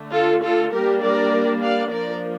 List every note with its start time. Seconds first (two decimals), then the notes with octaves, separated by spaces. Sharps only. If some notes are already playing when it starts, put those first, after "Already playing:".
Already playing: D3 A3
0.12 F4 A4
0.42 F4 A4
0.72 G3 A#3 D4 G4 A#4
1.02 A#4 D5
1.62 D5 F5
1.91 F3 A#3 D4 A#4 D5